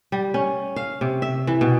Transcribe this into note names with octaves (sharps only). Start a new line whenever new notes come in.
G3
C#4
F5
C3
E5
E3
B2